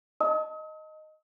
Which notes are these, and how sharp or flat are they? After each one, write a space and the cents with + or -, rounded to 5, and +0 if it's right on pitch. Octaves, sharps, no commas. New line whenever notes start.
D#5 +0 A5 +20 D#6 +45